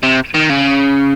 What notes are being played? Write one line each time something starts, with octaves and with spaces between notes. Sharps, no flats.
C3
D#3
C#3